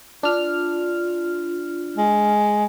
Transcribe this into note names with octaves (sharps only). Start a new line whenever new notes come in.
D4 F4 F6
G#3